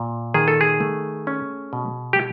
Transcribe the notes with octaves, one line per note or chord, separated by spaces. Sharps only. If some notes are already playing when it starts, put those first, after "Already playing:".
Already playing: A#2
D#3 G#4
A4
G#4
A3
C#4
B2
G4